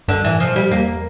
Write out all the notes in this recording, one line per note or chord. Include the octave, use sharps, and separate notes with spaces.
G2 D3
A2 E3
C3 F3
A#2
G3
A2
E2 A#3